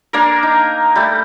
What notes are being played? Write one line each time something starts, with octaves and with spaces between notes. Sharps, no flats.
A#3 D4 A#4
D#4
G3 A3